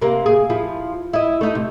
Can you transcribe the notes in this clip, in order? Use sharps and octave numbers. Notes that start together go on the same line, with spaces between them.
C3 A#3
G#4
F3 E4
E4 D#5
A3 D#4
C3